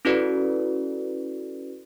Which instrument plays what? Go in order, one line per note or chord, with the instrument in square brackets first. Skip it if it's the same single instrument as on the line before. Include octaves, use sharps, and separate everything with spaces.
[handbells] C#4 E4 F#4 A4 B4 D5